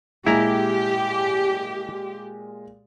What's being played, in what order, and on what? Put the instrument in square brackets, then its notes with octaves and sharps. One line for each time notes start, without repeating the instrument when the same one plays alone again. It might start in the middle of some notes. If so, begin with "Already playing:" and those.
[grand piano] A#2 G#3 [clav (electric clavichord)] E4 A#5 [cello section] G4